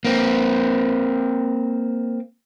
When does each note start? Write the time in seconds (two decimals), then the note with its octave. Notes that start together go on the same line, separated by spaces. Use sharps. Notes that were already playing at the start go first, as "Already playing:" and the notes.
0.05 A#3 C4